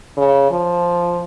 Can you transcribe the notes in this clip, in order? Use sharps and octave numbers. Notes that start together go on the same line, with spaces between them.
C#3
F3